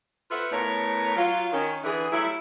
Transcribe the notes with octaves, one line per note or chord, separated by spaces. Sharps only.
F4 F#4 A4 B4 C5 E5
A2 A3 B3 A#4 C#5
F#3 F4
D#3 C#4
D3 E3 G#4
F#3 G3 A3 E4